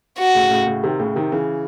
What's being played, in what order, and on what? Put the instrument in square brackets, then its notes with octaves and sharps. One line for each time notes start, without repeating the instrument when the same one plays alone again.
[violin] F#4
[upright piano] A2 C#3
A2 C#3
A2 C#3
C3 D#3
A2 C#3
C3 D#3
C#3 E3